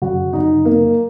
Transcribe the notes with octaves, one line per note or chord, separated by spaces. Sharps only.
F#2 C#3 F#3 F#4
D#4
A#3